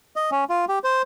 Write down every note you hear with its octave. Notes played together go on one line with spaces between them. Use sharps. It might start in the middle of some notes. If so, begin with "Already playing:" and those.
D#5
C#4
F4
G4
C5